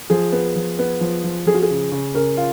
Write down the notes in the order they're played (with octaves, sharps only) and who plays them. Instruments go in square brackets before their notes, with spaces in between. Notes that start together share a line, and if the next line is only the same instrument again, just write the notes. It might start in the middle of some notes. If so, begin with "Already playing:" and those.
[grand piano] F3 [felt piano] G#4
[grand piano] B3
F3
B3
F3
F3
[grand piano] F3 [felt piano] G#4
[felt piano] F#4
G#4
[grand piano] C#3
C#3
[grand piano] C#3 [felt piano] A#4
[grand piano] F4